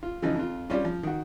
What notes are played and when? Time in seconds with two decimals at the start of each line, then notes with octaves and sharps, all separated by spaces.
0.03 F4
0.22 C#3 E3 F3 D#4
0.35 F2 F4
0.70 G3 C4 C#4 F4
0.85 F3
1.03 D#3 F#4